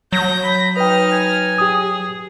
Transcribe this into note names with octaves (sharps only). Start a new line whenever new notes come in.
F#3 G6 A#6
B5
D#4 B4 D#5 G5 F6
G#5
G4 G#4 D#6